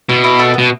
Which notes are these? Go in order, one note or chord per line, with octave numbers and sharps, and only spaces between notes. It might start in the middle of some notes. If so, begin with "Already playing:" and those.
B2 E4
E4
A3 A4
B2 B3